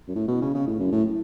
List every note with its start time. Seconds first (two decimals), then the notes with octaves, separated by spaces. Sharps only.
0.08 F#2
0.15 A2
0.28 B2
0.42 C#3
0.54 C#3
0.66 A2
0.79 F#2
0.92 A2